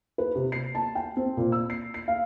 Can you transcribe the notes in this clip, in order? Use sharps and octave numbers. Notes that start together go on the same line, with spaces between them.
B4
C3
C7
A5
G5
C4
A#2
E6
C7
C7
F5